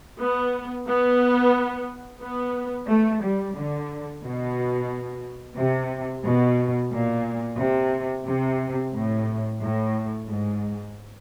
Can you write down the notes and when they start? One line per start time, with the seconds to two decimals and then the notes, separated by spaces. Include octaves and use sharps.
0.20 B3
0.87 B3
2.22 B3
2.89 A3
3.22 G3
3.56 D3
4.23 B2
5.57 C3
6.25 B2
6.92 A#2
7.59 C3
8.27 C3
8.94 A2
9.60 A2
10.29 G#2